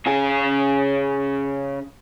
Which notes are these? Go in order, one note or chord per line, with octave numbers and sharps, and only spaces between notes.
C#3 G#4